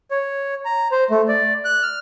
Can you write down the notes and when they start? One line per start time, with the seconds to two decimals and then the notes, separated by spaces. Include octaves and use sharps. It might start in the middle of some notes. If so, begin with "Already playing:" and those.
0.11 C#5
0.65 A#5
0.92 C5
1.11 A3
1.28 D5
1.65 F#6
1.83 F6